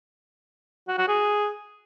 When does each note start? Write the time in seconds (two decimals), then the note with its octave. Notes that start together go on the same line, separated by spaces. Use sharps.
0.88 F#4
0.98 F#4
1.08 G#4